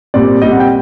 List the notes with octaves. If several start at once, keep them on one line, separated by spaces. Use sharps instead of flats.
A#2 G3 C4 D5
A#2 G3 C4 D#5
F#5
G5